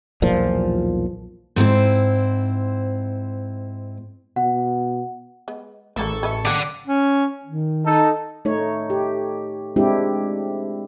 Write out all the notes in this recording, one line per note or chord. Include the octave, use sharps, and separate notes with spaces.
B1 E2 A#2 F3
G#2 C4 E4 C5
B2 F#5
G#3 B3
A1 C#3 A#3 E4 A4 C#6
G#4 B4 E5
A#3 C4 D5 F#5
C#4
D#3
D#4 A4
A3 D#4 C#5
G4
G#3 C4 D4 E4 G4